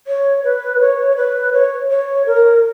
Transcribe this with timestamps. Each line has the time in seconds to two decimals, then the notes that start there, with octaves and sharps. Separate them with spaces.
0.07 C#5
0.44 B4
0.80 C#5
1.17 B4
1.53 C#5
1.89 C#5
2.26 A#4